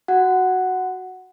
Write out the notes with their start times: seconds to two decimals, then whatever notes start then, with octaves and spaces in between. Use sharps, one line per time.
0.08 F#4 F#5